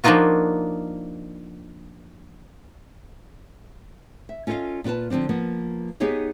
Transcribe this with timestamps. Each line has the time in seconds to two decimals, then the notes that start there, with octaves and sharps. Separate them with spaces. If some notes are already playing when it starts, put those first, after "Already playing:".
0.04 F3 A#3 D4 D#4 F4 F#4
4.29 E5
4.47 C#4 F4 A4 C#5 D#5 F5
4.84 A#2 D4 F4 B4 A5
5.10 D3 F3 G#3 C4 D4
5.29 F3 A#3 B3
6.00 B3 D#4 G4 G#4 C#5 D#5